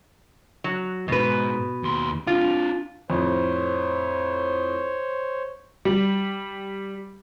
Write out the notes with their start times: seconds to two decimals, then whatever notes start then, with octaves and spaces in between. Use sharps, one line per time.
0.64 F#3
1.08 D#2 G#2 B2 B4
1.83 D#2 C6
2.27 C4 D4 F4
3.10 F2 A2 C5 C#5
5.85 G3